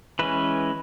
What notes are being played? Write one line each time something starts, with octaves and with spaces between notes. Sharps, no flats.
E3 G#3 C#4 B4